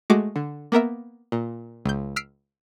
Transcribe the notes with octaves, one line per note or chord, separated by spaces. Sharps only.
G#3 A3 F#4 D6
D3
A#3 B3 A#4 E5
A#2
C#2 G6
E6 F6 B6 C7 D7